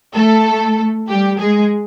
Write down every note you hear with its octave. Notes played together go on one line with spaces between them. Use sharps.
A3 A4
G3 G4
G#3 G#4